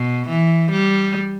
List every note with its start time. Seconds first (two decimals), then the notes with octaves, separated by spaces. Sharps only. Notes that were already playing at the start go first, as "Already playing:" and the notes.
Already playing: B2
0.29 E3
0.71 G3